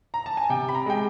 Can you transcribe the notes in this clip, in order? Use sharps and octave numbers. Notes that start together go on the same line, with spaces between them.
A#5
A5
G#5
C3 G5
B5
A#5
G#3 G5